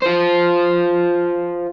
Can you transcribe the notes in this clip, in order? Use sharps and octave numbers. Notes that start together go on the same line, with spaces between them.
F4 C5